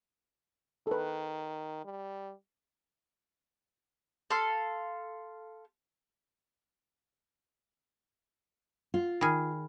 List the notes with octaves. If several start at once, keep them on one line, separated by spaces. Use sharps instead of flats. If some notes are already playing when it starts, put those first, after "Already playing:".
D#3 A4 B4
G3
A4 F5 C6
F4
D#3 G#4 B5 F6